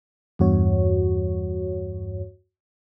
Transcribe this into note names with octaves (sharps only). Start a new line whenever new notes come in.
E2 G2 F#4 C#5